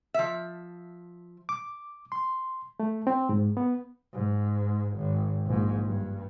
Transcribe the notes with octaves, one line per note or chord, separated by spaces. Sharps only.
F3 E5
D6
C6
A3
C4
G#2
B3
G#2
G#1
A#1 G#2
G2